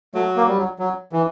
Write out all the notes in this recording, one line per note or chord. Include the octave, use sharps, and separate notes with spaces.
F#3 A3
A#3
G3
F#3
F#3
E3